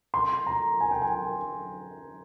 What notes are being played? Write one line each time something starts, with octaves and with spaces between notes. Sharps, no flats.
C6
A#5
G#5
G5
G#5